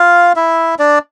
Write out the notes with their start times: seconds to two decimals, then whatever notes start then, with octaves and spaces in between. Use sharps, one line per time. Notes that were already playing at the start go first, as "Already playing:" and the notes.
Already playing: F4 F5
0.36 E4 E5
0.79 D4 D5